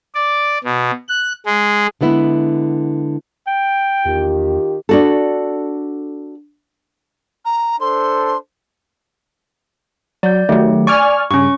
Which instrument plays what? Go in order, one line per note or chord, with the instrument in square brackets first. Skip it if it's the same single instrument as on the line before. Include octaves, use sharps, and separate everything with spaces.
[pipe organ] D5
B2
F#6
G#3
[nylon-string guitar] D3 G#3 B3 E4
[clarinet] G5
[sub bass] E2 [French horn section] D#3 F4 G4
[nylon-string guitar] D4 F#4 A4
[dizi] A#5
[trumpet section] D4 A4 C5 [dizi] C6
[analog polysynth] F#3 [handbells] D5 G6
[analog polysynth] D#3 F#3 [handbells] A3 G4
[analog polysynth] D5 G#5 F6 [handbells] C#6
[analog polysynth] G2 C#3 [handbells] C#4 C#6